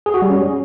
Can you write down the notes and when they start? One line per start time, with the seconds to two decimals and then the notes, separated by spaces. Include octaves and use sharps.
0.06 G#4
0.14 F#4
0.22 G3
0.30 C#4